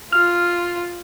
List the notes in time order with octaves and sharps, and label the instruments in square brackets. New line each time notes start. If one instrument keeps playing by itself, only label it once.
[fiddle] F4 [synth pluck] F6